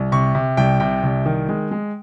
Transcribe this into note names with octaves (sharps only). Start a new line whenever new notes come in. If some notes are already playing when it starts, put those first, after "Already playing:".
Already playing: C2
C3 C#6
C3
C2 G5
C3 G5
C2
D#3
G#3
G#3